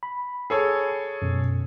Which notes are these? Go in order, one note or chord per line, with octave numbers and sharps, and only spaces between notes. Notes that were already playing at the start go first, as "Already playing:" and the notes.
B5
G#4 A4 C#5
F#2 B2